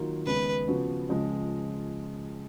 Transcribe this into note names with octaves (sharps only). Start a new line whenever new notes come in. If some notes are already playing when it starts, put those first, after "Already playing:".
Already playing: D#3 F#3 A#3 F4
D#2 C#3 G#3 B3 B4
C#3 F3 B3 F#4
C#2 C#3 F3 G#3